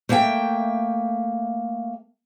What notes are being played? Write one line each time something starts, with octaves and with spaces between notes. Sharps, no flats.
A3 A#3 E5 F#5 G5